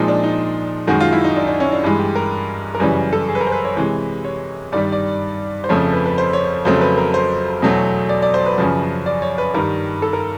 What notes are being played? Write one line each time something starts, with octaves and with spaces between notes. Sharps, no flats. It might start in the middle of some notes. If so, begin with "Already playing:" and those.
Already playing: A#2 F3 G#3 D#4
D4
D#4
F#2 D#3 G#3 F#4
F4
E4
D#4
D4
D4
C#4
D4
G2 E3 G#3
G4
A#4
A#4
F#2 C#3 E3 G3 B4
A4
G#4
B4
A#4
C5
B4
C#5
C3 E3 G#3
C#5
G2 D#3 G3 D5
D5
C5
F2 C#3 F3 A3 C#5
B4
B4
C5
C#5
F2 C#3 F#3 A3 C5
B4
A#4
C5
E2 B2 F#3 A3
D5
D5
C5
B4
F#2 C#3 F3 B4
D5
C#5
B4
G2 D#3 G3 A#4
A4
A#4